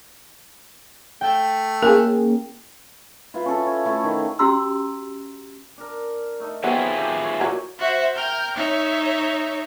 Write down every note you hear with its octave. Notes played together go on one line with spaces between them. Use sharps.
A3 G5
A#3 C#4 E4 G#4 A#4
E4 F4 B4 F5
C#4 A4
C#5
A3 E4 A4
D#3
C#4 F#4 G4 A#5 C6 E6
D4 A#4
A3 D#4
F#3 B3 C4 E4 F4 G#4 B5
G4 A4
B4 C#5
A#2 F#4 C#5 A#5
F#4 C5 E5
A#4 G5 F6 G6
D#4 C#5 E5